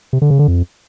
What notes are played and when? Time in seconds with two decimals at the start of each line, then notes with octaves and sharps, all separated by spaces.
0.13 C3
0.22 D3
0.30 C#3
0.39 D3
0.48 F2